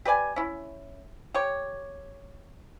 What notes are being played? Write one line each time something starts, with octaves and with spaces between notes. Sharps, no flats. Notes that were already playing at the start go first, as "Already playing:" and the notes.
G4 B4 D5 G#5
C#4 E4
G4 C#5